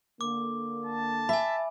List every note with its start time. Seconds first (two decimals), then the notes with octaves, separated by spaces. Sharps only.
0.21 D3 A#3 D6
0.86 A5
1.29 E5 G#5 B5